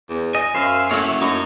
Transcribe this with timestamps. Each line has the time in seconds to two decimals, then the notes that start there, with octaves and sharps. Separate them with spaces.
0.09 E2
0.35 D#5 G#5
0.55 F#2 C5 E5 F5
0.91 A3 A#3 C#4 E4 F#4 C#5
1.21 F#2 D#4